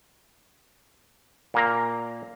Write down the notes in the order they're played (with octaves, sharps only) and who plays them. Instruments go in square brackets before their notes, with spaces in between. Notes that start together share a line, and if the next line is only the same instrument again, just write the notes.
[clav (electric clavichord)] A#2 A#3 A#5